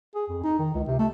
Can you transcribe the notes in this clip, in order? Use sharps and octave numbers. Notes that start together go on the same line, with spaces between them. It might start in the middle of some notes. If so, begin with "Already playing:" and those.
G#4
F2
D#4
D#3
C#2
C3
A3